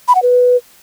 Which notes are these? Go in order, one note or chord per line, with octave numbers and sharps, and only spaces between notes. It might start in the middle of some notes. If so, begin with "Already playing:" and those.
B5
F#5
B4